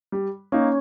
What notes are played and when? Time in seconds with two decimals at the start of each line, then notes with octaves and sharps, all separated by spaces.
0.12 G3
0.52 A#3 C#4 D#4